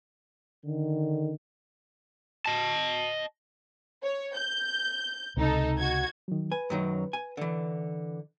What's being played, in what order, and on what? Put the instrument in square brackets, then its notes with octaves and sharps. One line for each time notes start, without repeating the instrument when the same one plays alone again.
[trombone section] D3 D#3
[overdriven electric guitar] D#5 A5
[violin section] C#5
G6
[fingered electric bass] C#2 C3 [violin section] D#4 A4
[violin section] F#4 G#6
[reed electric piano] D#3 F#3
[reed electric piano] B4 [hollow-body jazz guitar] G#5
[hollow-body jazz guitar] F#2 D#3 F#3
G#5
D3 E3